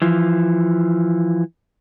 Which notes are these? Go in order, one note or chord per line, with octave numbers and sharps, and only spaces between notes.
E3 F3